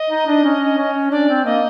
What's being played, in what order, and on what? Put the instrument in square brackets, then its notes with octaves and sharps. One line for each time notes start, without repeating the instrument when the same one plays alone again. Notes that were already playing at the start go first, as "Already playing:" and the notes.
Already playing: [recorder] D#5
[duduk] D#4
D4
C#4
C#4
[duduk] D4 [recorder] D5
[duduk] C4
[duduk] A#3 [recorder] D#5